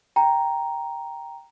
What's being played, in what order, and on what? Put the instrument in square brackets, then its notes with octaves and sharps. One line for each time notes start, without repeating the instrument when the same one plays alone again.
[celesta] G5 A#5